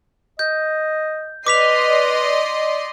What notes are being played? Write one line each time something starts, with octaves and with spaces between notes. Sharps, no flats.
D#5 G6
B4 D5 D#5 C6 D6 B6 F7